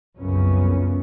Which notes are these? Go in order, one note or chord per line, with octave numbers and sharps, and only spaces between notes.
C2 F#2 C#3 F3 B3 C#4